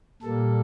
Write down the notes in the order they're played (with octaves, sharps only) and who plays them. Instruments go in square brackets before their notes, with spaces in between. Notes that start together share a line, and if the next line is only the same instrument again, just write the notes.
[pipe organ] A#2 G3 A#3 A4